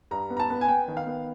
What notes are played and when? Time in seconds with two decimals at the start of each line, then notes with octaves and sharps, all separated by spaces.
0.11 G2 A#5
0.30 B3
0.37 A#5
0.40 A5
0.50 B3
0.61 G#5
0.68 B3 G5
0.88 D#3
0.97 F5
1.06 B3